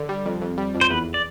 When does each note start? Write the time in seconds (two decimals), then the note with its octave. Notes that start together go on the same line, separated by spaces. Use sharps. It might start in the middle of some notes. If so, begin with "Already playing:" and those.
Already playing: D3
0.09 G3
0.26 F2
0.41 F2
0.58 G3
0.74 F2
0.81 C5
0.90 E2 B4
1.14 D5